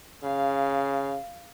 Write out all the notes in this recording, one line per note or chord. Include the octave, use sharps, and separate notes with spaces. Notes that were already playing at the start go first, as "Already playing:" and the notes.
C#3 F5